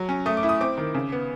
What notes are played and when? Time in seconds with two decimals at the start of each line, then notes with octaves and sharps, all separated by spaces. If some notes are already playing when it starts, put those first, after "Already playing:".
Already playing: F#3
0.09 C#4
0.26 A3 D#6
0.37 D6
0.43 E4
0.49 D#6
0.61 C4 D6
0.78 D#3
0.94 C#3
1.12 B3